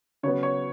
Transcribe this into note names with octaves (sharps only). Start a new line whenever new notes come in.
C#3 F#3 B3 C#5
C#5